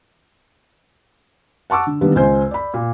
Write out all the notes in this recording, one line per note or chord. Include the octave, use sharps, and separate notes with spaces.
F#5 A5 C#6 D6 E6
D3
D3 D#3 G3 A#3 B3 D4
C#2 C5 G#5 G6
D5 B5
A#2